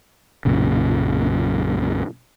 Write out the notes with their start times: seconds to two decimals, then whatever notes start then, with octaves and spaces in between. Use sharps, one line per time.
0.45 B1 F#2 A#2 C#3